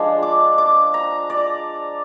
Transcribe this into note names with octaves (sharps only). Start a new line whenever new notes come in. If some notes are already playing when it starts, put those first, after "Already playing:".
Already playing: F3 G#3 D4
D6
D6
A#5
D5